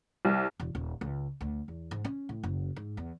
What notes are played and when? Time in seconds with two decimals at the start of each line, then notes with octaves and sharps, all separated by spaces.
0.25 C2
0.60 E1
0.75 D#1
1.01 C#2
1.41 D2
1.68 E2
1.91 G#2
2.05 C#4
2.29 A2
2.43 F#1
2.76 G#2
2.97 E2